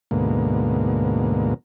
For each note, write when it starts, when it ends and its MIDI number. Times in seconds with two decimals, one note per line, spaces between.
0.11 1.54 38
0.11 1.54 44
0.11 1.54 47
0.11 1.54 58